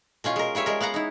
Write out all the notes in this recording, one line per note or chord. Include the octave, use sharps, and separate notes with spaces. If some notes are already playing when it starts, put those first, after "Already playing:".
B2 C#4 F4
G#3 A#4
G3 F4 C#5 E5
G#3 A#4
B3 F5 F#5 A#5
D#4 E4